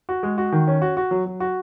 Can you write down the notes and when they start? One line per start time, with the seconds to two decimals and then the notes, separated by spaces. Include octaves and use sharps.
0.09 F#4
0.23 G#3
0.38 F#4
0.52 D#3
0.68 C#4
0.82 F#4
0.97 F#4
1.11 F#3
1.26 F#3
1.40 F#4